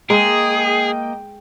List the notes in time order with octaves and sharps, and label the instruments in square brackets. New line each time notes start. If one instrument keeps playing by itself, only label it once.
[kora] G#3 [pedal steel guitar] A#3 D#5 [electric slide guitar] G#4 [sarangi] G5